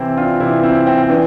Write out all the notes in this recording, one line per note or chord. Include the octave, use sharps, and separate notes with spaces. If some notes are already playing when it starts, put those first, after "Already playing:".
Already playing: C3 E3 C4 E4
D4 F4
C3 E3 C4 E4
C4 E4
C4
C4
E3 B3 D4